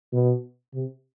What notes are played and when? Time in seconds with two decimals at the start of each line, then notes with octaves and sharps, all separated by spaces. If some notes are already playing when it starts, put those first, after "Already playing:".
0.12 B2
0.74 C3